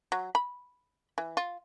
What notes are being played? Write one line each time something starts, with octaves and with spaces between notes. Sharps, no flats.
F#3
B5
E3
F4